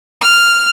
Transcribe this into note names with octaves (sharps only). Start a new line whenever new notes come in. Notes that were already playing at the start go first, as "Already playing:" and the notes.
F6